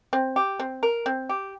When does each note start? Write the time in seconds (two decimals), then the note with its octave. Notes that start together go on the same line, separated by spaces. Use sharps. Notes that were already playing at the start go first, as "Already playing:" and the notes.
0.13 C4
0.36 G4
0.60 C4
0.83 A#4
1.06 C4
1.29 G4